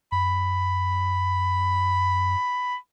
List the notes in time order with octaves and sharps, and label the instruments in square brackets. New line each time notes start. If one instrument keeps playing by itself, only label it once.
[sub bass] F#2 [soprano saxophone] B5